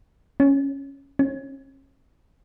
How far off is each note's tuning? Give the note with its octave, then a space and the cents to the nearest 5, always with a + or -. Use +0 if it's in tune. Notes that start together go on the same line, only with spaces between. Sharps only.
C#4 -5
C#4 -35